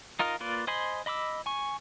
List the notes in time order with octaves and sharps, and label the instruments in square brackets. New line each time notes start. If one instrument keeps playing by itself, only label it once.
[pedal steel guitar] D#4 F4 A#4 D#5 F5
A#3 F4 B4 D5
C5 D#5 G#5 B5 C6
D#5 B5 D6 E6
G#5 C#6